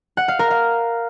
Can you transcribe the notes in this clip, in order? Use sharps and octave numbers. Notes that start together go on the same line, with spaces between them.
F#5
F5
A#4
F5